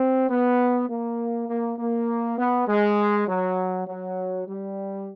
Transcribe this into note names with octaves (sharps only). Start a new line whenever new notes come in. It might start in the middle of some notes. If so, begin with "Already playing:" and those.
Already playing: C4
B3
A#3
A#3
A#3
B3
G#3
F#3
F#3
G3